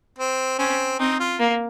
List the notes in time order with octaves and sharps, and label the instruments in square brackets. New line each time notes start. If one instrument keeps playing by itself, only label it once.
[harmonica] C4
[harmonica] C4 [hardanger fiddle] C#4
[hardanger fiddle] C4 [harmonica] D#4
[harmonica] F4
[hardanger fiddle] A#3